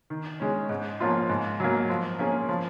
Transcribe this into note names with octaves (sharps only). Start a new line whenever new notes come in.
D#3
G#3 C#4
G#2
F3 A#3 C#4 F4
G#2
F#3 A#3
F3
A#3 C#4 G#4
F3